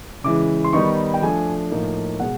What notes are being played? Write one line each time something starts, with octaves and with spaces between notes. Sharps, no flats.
C#3 E3 G#3 D6
C6
D#3 G3 B3 D#4 C#6
G5
F3 A3 D4 G#5
A2 F3 A#3 D#4
B2 G#3 F#5